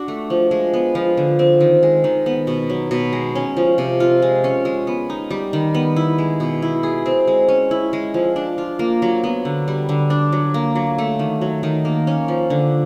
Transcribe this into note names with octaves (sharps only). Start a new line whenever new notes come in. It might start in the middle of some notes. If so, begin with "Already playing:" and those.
Already playing: D4 F#4
A3
F3
G#3
B3
F3
D3
C4
D#3
G#3
D#3
B3
B2
F#3
B2
G#3
C#4
F3
C3
F4
G#3
C#4
G#3
B3
D#4
G3
D#3
B3
E4
G#3
B2
E4
G#4
C4
G#3
C#4
E4
G#3
F3
D4
F4
A#3
F#3
B3
D3
G3
D3
D4
F#3
A#3
F#3
A3
D#3
F#3
D#3
A#3
C#4
F3
D3